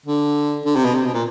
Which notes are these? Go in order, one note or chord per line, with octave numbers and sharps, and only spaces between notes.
D3
D3
C3
B2
C3
B2
A#2